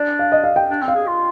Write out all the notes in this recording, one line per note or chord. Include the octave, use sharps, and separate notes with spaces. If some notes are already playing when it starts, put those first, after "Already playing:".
Already playing: D4 D5
F5
D#5
F5
G5
D4
C4
F5
G#4
F4